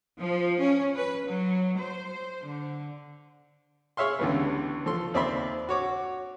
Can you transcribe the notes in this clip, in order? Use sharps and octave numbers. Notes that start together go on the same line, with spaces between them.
F3
C#4
B4
F#3
C5
D3
G#4 C#5 E5 F5 C6
C#2 D3 E3 G3 B3
F3 A4 C6
D#2 C4 D5 E5 B5 C6
F#4 C#5 D6